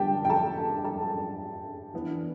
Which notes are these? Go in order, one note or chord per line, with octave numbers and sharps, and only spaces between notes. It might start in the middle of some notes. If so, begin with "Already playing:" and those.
Already playing: D3 G3 B3 D4 G4 G5 A5
G5
A4 A5
A4 A5
E3 B3 D4